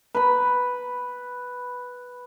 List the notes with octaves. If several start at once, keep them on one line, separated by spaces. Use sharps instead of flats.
B4 B5